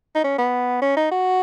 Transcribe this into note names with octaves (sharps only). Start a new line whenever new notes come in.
D#4
C#4
B3
C#4
D#4
F#4